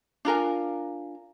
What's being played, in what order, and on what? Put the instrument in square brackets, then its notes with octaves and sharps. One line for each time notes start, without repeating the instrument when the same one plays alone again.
[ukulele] D4 F4 A#4 G#5